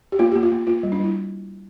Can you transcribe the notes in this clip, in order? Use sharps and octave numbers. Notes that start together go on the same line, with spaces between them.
G4
A#3 F4
A#3 G4
F4
A#3
A#3 F4
G3
D4
G3 E4